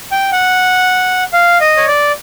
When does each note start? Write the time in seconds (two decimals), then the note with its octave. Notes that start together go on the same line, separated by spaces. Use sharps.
0.12 G5
0.32 F#5
1.33 F5
1.61 D#5
1.77 C#5
1.88 D5